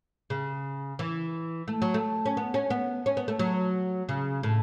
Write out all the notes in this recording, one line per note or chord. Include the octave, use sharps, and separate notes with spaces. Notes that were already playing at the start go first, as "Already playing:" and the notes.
C#3
E3
A3
F#3
A3
C#4
B3
C#4
B3
C#4
B3
A3
F#3
C#3
A2